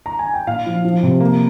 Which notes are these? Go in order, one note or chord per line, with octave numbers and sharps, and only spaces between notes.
A#5
G#5
G5
A#2 F5
F3
F3
C3
A#3